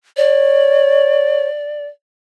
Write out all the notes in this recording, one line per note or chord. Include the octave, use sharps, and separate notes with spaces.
C#5 D5